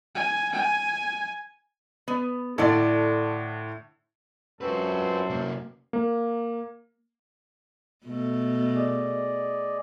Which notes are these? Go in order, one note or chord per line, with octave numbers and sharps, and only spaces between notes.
G#5
G#5
B3
A2 D3 A4 D5
F#2 C4 F4 F#4 A4 B4
C3 A#3
A#3
B2 A3
G#4 D5 D#5